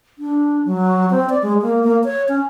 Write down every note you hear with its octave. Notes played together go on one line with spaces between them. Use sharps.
D4
F#3
C4
D5
G#3
A#3
A#3
C#5
C#4